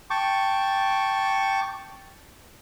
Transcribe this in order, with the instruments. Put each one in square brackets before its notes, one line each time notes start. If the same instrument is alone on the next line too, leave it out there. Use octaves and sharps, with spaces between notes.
[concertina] G5 A5 C#6 D6